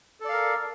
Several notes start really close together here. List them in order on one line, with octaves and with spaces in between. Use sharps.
A4 D5 F5 A#4